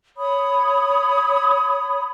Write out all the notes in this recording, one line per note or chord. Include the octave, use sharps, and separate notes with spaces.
C#5 B5 D#6